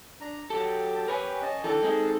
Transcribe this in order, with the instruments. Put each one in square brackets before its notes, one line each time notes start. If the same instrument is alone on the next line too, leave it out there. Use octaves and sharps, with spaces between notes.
[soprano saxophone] D4 [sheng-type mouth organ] A#5
[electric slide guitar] F#3 A4 [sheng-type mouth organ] G4 G5 [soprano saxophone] A5
[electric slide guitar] A#4 C#5 G#5 [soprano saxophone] B4
[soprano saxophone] C#4 [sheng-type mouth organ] D#5 A5
[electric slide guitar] D3 E3 [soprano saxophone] A4 [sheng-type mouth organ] G5 A#5
[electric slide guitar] G#3 C4 D#4 [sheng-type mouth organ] G#4